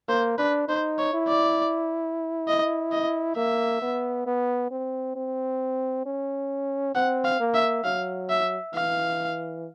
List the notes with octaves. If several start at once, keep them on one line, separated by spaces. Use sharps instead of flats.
A#3 C5
D4 B4
D#4 C5
C#5
E4
D5
D#5
D#5
A#3 E5
B3
B3
C4
C4
C#4
C4 F#5
F5
A#3
E5
F#3 F5
E5
E3 F5